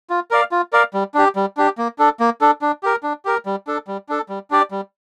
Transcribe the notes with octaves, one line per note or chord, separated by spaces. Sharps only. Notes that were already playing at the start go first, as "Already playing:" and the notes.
F4
A#4 D5 F5
F4
A#4 D5 F5
G3
D4 G4
G3
D4 G4
A#3
D4 A4
A#3
D4 A4
D4
G4 A#4
D4
G4 A#4
G3
D4 A4
G3
D4 A4
G3
D4 G4 D5
G3